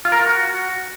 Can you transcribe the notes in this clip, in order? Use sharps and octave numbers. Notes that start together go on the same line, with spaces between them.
F4
A#4
F4
F#4